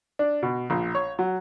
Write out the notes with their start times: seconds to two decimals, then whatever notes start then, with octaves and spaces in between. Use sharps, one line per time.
0.19 D4
0.43 B2
0.70 A#1
0.95 C#5
1.19 F#3